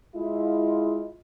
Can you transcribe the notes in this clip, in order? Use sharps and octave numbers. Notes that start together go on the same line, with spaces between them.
G#3 E4 F4